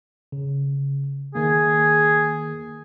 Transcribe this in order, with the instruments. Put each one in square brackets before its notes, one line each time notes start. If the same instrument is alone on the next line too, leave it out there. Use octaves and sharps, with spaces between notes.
[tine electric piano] C#3
[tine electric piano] D#3 A#3 [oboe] G#4